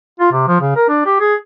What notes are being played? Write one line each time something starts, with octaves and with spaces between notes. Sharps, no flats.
F4
C3
F3
C#3
A#4
D4
G4
G#4